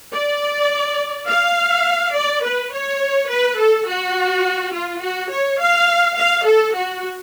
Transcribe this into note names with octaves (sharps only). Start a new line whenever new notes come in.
D5
F5
D5
B4
C#5
B4
A4
F#4
F4
F#4
C#5
F5
F5
A4
F#4